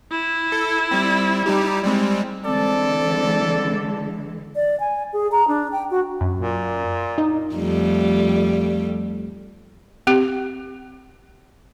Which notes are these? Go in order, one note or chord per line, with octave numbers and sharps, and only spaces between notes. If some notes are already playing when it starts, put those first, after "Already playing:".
E4
A4
G3 C4
G3 D#4 G4
G3 G#3 C4
D3 E3 G#3 C4 A4 D5
D5
G#5
G#4
A#5
D4
G5
F#4
F#2
A#2
D#4
F2 G3 A3
C4 G4